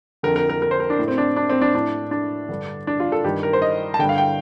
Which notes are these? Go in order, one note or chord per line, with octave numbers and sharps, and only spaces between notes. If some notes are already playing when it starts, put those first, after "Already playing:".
F2 D3 A#4
A#4
A#4
A#4
C5
A#4
D4
A2
C4
D4
D4
C4
D4
A2 D4
D4
G2 D3
D4
F4
A4
G2 D#3 G4
A#4
C5
D#5
A5
G2 D3 G5
F5
G5